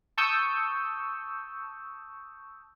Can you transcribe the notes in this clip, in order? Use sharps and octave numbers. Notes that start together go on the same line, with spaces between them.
A5 C#6 D#6 E6 G6